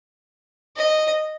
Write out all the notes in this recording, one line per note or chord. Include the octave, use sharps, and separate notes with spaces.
D#5